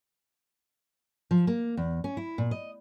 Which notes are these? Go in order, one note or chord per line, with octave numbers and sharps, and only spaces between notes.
F3
A#3
E2
C#4
E4
A#2
D#5